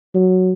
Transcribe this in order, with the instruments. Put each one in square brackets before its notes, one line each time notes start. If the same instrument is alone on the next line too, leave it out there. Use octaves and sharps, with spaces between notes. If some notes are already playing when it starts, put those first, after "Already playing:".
[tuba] F#3